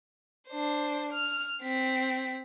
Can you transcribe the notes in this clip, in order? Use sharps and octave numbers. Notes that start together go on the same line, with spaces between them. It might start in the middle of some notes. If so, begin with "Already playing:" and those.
D4 C5
F6
C4 B6